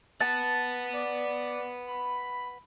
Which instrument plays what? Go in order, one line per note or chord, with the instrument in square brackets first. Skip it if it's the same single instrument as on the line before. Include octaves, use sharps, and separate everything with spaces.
[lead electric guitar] B4 F#5 [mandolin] A5
[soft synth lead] D5
B5